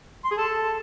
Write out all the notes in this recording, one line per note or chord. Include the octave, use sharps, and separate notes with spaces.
C6
G#4
A4